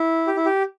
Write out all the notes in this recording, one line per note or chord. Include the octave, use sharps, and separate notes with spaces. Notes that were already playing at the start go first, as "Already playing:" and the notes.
Already playing: E4
G4
E4
G4